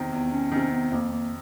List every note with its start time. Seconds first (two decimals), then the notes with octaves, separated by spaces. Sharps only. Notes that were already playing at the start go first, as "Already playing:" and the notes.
Already playing: E2 C3 D#3
0.12 E2 B3
0.32 C#4
0.52 C3 D#3 C#4
0.72 B3
0.91 F2 A#3
1.12 A#3